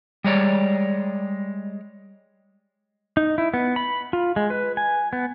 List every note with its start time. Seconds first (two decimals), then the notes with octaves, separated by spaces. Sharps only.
0.24 G3 G#3 C#5 D5
3.17 D#4
3.38 E4
3.54 B3
3.76 B5
4.13 F4
4.36 G#3
4.50 B4
4.77 G#5
5.13 B3